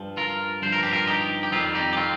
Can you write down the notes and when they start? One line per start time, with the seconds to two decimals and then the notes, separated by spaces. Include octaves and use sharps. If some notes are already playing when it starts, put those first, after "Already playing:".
Already playing: G2 F3
0.17 F4 A#4
0.62 G2 F3 C5
0.72 A#4
0.83 G4
0.92 F4 A#4
1.07 D#4 G4
1.43 G4
1.52 F2 D#3 G3 C4 F4
1.75 D#4 G4
1.93 G4
1.97 C4 F4